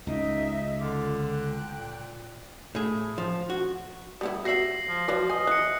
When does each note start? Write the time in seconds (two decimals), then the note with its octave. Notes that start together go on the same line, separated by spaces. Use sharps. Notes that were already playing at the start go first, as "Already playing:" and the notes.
0.07 C#2 C#3 D#4 D#5 E5
0.79 D3 F4 D6
1.27 G5 F#6
1.77 A#2
2.75 A2 G#4
3.18 F3
3.50 F#4
4.21 G3 B3 E4
4.45 F#4 E5 A#6 C7 F#7
4.88 F3
5.08 F3 F#3 B4 D5
5.30 D#5 G#5
5.47 E3 F#6 C#7